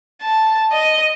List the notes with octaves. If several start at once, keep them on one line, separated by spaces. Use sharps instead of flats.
A5
D#5